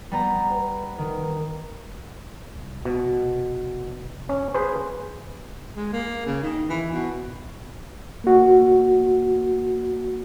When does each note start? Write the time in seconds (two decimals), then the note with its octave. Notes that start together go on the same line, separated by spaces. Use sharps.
0.12 G3 B3 A#5
0.51 B4
0.98 D#3
2.55 C2
2.85 F1 B2
4.29 C#4
4.54 G#4 B4 C5
5.76 G#3
5.92 A#3
6.25 C#3
6.43 D#3
6.69 E3
6.92 B2
8.24 A#3 F#4